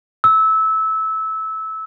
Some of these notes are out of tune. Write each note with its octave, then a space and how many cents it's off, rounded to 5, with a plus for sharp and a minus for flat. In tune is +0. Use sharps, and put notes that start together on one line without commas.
E6 -20